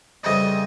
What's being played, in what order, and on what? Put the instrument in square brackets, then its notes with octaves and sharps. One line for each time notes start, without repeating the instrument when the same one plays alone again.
[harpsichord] F2 C#3 E3 G3 C4 [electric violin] D#5